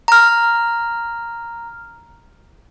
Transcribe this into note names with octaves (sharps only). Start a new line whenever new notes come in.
A#5 F6